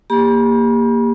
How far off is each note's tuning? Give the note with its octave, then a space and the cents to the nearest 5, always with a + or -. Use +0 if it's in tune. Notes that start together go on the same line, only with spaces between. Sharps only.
A#3 +0 G4 +30 B5 -40